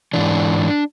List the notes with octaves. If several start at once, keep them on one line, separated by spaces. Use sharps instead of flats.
G#2 E3 D4